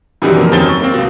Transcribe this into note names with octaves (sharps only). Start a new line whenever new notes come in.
F#2 B2 D#3 E3 G3
F2 A#3
E1 F#2 D#3 C4 A6 G7
C#6
A#3 C4
C#2 B2